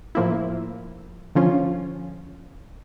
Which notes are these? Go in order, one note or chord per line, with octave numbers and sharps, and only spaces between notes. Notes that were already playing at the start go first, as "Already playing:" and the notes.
A2 F3 A#3 E4
D3 F3 C#4 F4